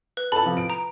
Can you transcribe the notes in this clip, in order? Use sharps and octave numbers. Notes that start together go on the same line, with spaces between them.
B4
A4 A5 B5
C3 F3
D7
A#5